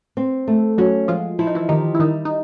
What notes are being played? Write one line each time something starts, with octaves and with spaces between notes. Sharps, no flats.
C4
A3
F#3 C#4 F#4
F3 G#3 F4
F3 E4
D#4
E3 E4
D#3 D#4 G4
E4
D#3 G3 D#4
D#4